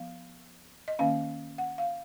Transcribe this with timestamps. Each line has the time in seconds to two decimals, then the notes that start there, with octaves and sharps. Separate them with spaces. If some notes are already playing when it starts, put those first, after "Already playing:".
Already playing: F3 B3 F5
0.88 D#5
0.99 D#3 A#3 C#4 F5
1.58 F#5
1.78 F5